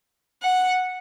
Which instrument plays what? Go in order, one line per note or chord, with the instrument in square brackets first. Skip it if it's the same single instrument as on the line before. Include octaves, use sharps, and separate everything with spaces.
[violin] F#5